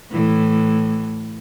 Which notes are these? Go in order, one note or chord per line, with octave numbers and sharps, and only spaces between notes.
A2 E3